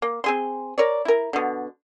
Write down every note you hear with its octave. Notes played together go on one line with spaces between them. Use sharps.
A#3
C4 G#4 C6
A#4 C#5 D5
E4 A#4
B2 D3